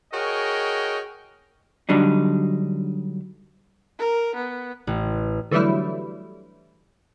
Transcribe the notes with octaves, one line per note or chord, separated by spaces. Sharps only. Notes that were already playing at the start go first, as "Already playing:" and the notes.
F#4 G#4 A#4 C#5 D#5 G5
D3 F#3 G3 D4 D#4
A#4
B3
A1
D3 E3 F#3 G3 A3 E4